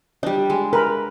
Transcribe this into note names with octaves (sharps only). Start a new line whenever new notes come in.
G3 D4 D#5
G#3
A#4 B4 B5